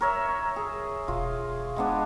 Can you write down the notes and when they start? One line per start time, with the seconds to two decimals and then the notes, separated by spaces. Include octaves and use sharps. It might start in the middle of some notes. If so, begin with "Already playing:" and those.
0.01 A#4 C#5 E5
0.56 G#4
1.08 E1 F4
1.76 G#3 B3 D4